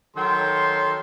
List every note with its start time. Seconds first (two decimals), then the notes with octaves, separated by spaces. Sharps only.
0.16 D#3 F#3 A4 G5 C6